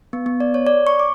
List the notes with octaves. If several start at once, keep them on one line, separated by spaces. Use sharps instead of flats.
B3
B3
D5
C#5
D5
C#6
D6